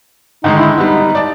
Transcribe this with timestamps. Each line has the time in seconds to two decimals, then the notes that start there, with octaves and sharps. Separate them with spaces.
0.44 D3 D#3 G#3 D#4
0.58 E4
0.78 G3 B3 D#4
1.15 D5 A5